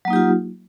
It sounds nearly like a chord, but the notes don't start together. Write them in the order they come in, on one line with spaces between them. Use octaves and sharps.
F#3 A#3 D#4 G4 F4